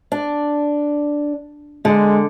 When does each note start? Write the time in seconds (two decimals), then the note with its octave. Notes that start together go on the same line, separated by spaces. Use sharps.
0.12 D4
1.85 D3 G#3